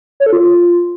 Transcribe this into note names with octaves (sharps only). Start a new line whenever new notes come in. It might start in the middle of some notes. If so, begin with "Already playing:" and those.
C#5
A4
F4